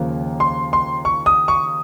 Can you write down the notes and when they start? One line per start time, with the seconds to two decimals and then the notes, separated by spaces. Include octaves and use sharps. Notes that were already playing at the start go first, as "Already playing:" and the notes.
Already playing: D#2 C#3 F3 A#3
0.40 C6
0.73 C6
1.05 C#6
1.26 D#6
1.48 C#6